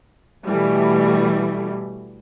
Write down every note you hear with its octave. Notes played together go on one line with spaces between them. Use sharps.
B2 E3 G3 A3